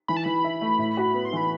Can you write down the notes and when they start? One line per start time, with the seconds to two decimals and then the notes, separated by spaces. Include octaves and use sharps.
0.08 E3 B5
0.17 A5
0.24 E3 B5
0.44 E4
0.61 A3
0.78 A2
0.97 F#4
1.14 B3
1.25 C6
1.33 E3 B5